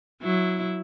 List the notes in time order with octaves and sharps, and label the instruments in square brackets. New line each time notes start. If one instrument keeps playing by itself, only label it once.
[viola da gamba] F#3 E4